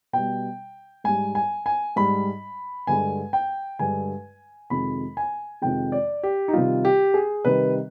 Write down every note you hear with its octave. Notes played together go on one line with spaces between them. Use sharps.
B2 G3 G5
G#2 G3 G#5
G#5
G#5
G#2 G3 B5
G2 D3 G#3 G#5
G5
G2 D3 G#3 G#5
F2 C3 D#3 G#3 B5
G#5
F2 C3 D#3 G#3 G5
D5
G4
D#4
C3 D#3 G3 F4
G4
G#4
C3 D#3 G3 B4